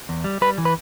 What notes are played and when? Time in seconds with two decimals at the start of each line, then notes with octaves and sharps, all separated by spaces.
0.09 E2
0.24 G3
0.41 G3 B4
0.58 E3
0.65 B4